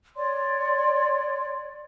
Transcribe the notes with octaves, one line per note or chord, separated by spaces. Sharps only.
C#5 D5 C6